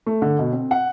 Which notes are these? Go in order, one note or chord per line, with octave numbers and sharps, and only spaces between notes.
A3
D3
B2
C4
F#5